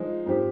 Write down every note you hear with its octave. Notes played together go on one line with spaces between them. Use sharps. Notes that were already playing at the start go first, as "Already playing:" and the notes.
Already playing: F3 G#3 D#4
G#2 F3 C4 G4